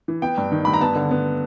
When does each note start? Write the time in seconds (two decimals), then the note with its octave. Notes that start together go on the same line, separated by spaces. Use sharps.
0.08 E3
0.22 B3 G5
0.38 G2
0.52 D#3
0.65 G2 B5
0.73 A#5
0.81 B3 A5
0.95 D3
1.11 B3